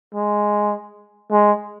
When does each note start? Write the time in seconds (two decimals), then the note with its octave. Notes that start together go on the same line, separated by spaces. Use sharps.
0.15 G#3
1.31 G#3